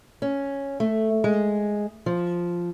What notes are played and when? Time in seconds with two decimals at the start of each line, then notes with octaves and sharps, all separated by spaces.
0.22 C#4
0.80 A3
1.24 G#3
2.06 F3